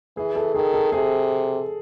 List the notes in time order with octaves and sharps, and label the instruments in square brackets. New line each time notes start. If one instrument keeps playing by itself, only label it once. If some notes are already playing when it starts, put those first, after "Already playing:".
[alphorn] E3 [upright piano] G#4
[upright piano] A4
[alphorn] D#3 [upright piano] G#4
[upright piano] A4
[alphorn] C3 [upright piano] G#4